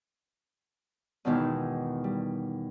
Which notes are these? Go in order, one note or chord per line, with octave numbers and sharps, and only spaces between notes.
E2 G#2 B2 D#3 E3
G3